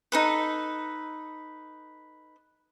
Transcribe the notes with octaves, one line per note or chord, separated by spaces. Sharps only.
D#4 A4 B4